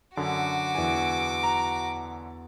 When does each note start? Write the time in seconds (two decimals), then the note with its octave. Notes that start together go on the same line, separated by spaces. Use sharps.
0.17 F#2 D3 F#4 D6
0.75 E2 D5 G#5
1.43 A#5